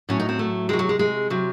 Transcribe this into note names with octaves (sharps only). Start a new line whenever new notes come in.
A2 F#3 C#4
D#4
C4
A3
C3 F#3 G#3
F#3
G#3
G#3
C3 F#3